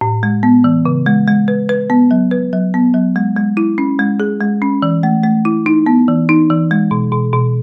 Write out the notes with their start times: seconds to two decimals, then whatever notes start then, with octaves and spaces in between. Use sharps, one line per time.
0.01 A2
0.23 G#3
0.43 B3
0.64 E3
0.86 C#3
1.06 G#3
1.27 G#3
1.48 B4
1.69 B4
1.90 B3
2.11 F#3
2.31 B4
2.53 F#3
2.74 B3
2.94 F#3
3.16 G#3
3.36 G#3
3.57 E4
3.78 C#4
3.99 G#3
4.20 G#4
4.40 G#3
4.62 C#4
4.82 E3
5.03 A3
5.24 A3
5.45 E4
5.66 D#4
5.86 B3
6.08 E3
6.29 D#4
6.50 E3
6.71 G#3
6.91 B2
7.12 B2
7.33 B2